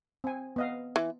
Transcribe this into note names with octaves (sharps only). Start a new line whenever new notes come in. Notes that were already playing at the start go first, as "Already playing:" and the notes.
C4 G#5
B3 D#5 F5
E3